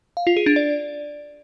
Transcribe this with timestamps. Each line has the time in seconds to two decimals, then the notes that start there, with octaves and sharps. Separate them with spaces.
0.17 F5
0.27 F4
0.36 G#4
0.46 D4
0.56 D5